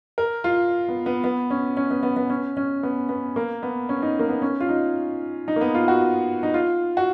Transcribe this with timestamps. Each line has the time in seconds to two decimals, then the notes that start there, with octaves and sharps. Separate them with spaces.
0.18 A#4
0.44 F4
0.89 B3
1.06 B3
1.24 B3
1.50 C#4
1.77 C#4
1.91 B3
2.03 B3
2.17 B3
2.30 C#4
2.57 C#4
2.83 B3
3.09 B3
3.36 A#3
3.63 B3
3.89 C#4
4.02 D#4
4.19 A#3
4.29 B3
4.42 C#4
4.60 F4
4.69 D#4
5.48 D#4
5.56 A#3
5.61 B3
5.75 F4
5.88 F#4
6.43 D#4
6.54 F4
6.97 F#4